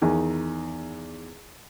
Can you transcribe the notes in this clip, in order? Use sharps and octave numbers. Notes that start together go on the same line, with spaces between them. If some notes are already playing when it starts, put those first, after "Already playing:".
E2 D#3